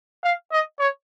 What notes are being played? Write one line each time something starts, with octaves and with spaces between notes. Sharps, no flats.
F5
D#5
C#5